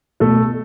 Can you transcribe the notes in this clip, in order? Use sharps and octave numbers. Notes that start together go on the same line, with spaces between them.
B2 A3 A4